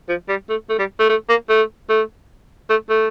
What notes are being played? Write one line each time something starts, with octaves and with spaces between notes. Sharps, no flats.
F3
G3
A3
A3
G3
A3
A3
A#3
A3
A3
A3
A3